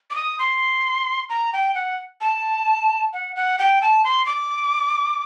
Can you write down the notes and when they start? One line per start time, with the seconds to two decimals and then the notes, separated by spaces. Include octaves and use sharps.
0.10 D6
0.16 D#6
0.39 C6
1.30 A#5
1.53 G5
1.75 F#5
2.21 A5
3.13 F#5
3.36 F#5
3.59 G5
3.82 A5
4.05 C6
4.26 D6